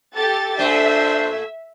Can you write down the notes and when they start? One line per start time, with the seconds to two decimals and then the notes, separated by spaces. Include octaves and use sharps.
0.15 G4 A4 A6
0.59 A#2 A3 D4 C5 E5